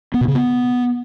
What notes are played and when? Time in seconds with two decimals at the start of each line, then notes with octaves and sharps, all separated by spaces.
0.14 B3
0.21 B2
0.28 C#3
0.35 B3